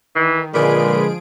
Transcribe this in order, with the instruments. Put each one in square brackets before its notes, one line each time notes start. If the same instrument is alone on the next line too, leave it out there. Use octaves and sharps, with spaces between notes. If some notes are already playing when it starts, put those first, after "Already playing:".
[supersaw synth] D#3 [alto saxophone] E3
[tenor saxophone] A#2 [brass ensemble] D3 G#3 [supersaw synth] F3 G#4 D7 [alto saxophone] B4